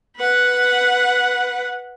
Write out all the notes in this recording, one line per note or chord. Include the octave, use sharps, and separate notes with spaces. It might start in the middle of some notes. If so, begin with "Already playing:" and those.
B4 F#5